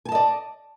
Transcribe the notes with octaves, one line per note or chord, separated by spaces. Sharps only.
D5 D#5 G#5 A5